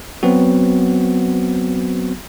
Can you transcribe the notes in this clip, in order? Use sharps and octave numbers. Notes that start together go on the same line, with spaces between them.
F#3 B3 C4 F#4